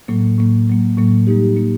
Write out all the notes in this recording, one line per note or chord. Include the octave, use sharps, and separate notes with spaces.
A2 F#3 A#3
A2 F#3 A#3
A2 F#3 A#3
A2 F#3 A#3
G3 A#3 D#4 G4
G3 A#3 D#4 G4